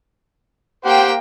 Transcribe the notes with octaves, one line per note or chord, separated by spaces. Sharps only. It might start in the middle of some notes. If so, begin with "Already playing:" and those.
A#3 G4 C5 F#5 G5